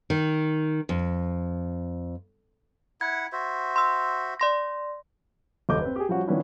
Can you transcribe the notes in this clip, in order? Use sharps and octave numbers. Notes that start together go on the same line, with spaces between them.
D#3
F2
E4 F#5 G#6
F#4 C5 E5
C6 E6
D5 C6 A#6
F#1 D#2 A4 D#5 D6 G6
C4 B4
G4 G#4
F3 G3 C#4 F#4
D#3 F3 B3 C#4 D4 E4